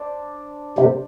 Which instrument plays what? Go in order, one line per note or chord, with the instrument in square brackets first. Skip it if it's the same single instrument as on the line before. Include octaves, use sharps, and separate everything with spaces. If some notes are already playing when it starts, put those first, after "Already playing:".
Already playing: [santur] D4 C5
[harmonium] C3